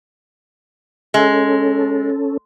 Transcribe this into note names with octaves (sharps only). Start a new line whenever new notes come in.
G#3 C#4 A4